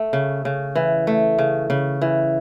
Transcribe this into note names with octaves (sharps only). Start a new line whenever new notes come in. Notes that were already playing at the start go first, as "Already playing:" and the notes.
Already playing: A3
C#3
C#3
E3
A3
C#3
C#3
E3